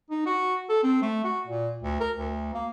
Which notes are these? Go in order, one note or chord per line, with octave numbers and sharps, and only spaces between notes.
D#4
F#4
A4
C4
A3
F#4
A#2
D2
A#4
D2
A#3